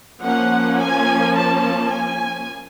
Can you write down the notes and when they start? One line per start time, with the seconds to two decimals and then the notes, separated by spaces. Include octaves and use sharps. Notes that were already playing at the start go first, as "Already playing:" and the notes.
0.23 F3 A#3 C#4 F#5
0.79 G#5
1.35 A5
1.91 G#5